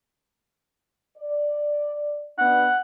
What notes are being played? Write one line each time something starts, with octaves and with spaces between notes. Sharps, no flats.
D5
B2 B3 D4 F#5